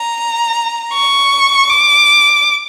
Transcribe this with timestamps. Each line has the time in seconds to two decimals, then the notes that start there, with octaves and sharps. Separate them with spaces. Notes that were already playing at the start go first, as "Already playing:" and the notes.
Already playing: A#5
0.93 C#6
1.70 D6